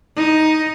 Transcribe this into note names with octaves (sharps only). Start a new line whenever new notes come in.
D#4